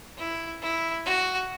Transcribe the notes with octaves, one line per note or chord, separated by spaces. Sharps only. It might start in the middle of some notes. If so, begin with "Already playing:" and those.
E4
E4
F#4